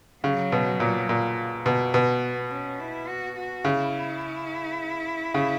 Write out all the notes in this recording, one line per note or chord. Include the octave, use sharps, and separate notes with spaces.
C#3 F#3
B2
A#2
A#2
B2
B2 B3
B3
C#4
E4
F#4
F#4
C#3 E4
C#3